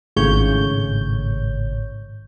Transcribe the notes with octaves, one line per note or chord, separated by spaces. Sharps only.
G#1 A2 C#3 C#5 G6